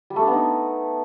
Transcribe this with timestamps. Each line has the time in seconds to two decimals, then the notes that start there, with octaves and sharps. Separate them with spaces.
0.10 G3
0.16 A3
0.22 D4
0.27 B3
0.33 D#4